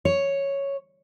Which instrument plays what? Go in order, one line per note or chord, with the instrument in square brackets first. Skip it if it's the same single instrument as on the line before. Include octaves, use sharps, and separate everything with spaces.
[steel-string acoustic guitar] C#5